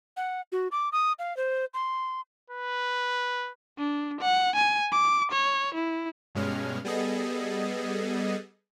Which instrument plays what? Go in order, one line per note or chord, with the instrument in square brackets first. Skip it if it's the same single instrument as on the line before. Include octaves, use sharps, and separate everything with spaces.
[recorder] F#5
F#4
D6
D#6
F5
C5
C6
[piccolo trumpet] B4
[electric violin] D4
F#5
G#5
D6
C#5
E4
[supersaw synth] G2 B2 G#3 C#4 F6
G3 B3 G#4 A4 D#5